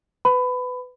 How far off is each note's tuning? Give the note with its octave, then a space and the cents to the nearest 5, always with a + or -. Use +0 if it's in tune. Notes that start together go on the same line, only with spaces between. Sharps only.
B4 +20 B5 +20